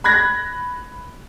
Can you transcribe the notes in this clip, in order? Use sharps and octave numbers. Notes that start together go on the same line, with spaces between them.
B5 F#6 G#6 A#6